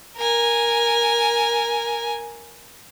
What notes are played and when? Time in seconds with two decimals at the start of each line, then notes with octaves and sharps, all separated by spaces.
0.17 A#4 G#5